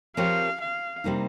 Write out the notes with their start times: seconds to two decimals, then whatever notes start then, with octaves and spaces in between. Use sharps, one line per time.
0.17 F3 C4 G4 A#4 C#5 F5
0.61 F5
1.04 C3 G3 A#3 D#4